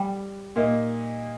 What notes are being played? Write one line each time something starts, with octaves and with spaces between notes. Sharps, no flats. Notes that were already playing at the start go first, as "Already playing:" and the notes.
Already playing: G3
A#2 A#3 D#4